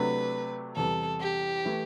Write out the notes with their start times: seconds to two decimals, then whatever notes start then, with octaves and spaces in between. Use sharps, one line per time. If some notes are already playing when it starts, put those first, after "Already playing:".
Already playing: C3 F#3 A3 D4 B4
0.76 E2 C3 E3 G3 A4
1.20 G4
1.65 E3 A3 E4